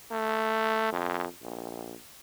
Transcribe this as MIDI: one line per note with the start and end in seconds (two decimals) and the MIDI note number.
0.11 0.88 57
0.92 1.26 41
1.42 1.94 34